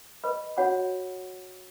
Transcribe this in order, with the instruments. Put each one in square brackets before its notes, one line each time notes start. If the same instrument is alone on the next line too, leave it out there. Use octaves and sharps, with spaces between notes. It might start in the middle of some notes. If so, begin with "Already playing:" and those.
[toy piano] B4 D#5 B5
F#4 C#5 F#5 B5